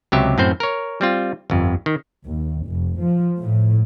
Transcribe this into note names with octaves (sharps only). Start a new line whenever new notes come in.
C#2 C3 F#3 G4 E5
F#2 A2 C4 C5
A#4 C#5
G3 C4 F4
G1 F2
D#3
D#2
F1
F3
A2